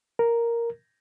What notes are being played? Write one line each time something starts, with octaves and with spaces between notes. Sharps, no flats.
A#4